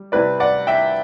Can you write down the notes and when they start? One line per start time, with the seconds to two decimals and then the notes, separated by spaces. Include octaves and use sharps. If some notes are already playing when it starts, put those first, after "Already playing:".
Already playing: G3
0.12 C3 G3 C4 E4 B4 D5
0.40 D5 F#5
0.67 E5 G5